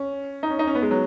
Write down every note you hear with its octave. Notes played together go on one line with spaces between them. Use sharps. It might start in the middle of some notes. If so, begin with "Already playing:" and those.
Already playing: C#4
D#4
C#4
D#4
C#4
B3
G#3
F#3